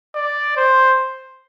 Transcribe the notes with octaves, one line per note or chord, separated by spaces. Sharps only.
D5
C5